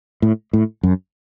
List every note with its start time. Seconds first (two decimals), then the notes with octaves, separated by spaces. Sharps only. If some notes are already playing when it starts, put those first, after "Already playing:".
0.22 A2
0.53 A2
0.83 F#2